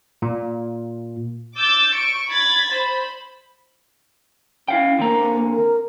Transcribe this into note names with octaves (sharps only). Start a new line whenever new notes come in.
A#2
D6 E6 G6 A6
C#6 D7
B5 G#6 A6 B6
C5 B5
C#4 E4 F5 G5
D3 A#3 C4 A#5
A#4